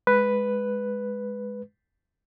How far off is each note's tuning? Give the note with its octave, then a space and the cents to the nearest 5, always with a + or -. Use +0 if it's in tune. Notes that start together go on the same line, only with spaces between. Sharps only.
G#3 +0 B4 +0